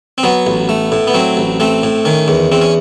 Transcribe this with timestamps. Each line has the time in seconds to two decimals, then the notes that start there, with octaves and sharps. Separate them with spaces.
0.18 C4
0.23 F#3 B3
0.47 A1
0.69 A3
0.92 A2
1.07 B3
1.14 F#3 C4
1.37 A1
1.60 A3 C4
1.83 A2
2.05 D#3 C#4
2.28 E2
2.52 E2 C4
2.61 C#4